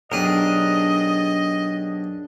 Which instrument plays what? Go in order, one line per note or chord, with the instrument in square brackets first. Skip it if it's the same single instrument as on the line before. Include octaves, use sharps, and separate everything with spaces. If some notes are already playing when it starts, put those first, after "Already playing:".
[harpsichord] B1 G4 [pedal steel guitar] D4 G#4 A#4 [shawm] D#5